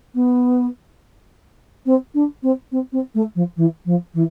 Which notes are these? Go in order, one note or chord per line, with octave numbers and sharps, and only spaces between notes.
B3
C4
D4
C4
C4
C4
A3
F3
E3
F3
E3